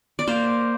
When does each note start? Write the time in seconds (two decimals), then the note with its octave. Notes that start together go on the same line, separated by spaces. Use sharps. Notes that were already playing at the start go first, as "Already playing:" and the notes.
0.19 D5
0.27 A#3 C5